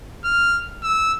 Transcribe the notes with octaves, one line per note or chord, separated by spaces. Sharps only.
F6
E6